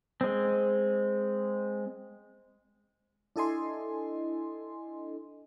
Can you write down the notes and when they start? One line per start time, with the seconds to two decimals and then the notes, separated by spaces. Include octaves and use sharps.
0.21 G#3 C4
3.36 D4 E4 A4 D#5 G#5 C6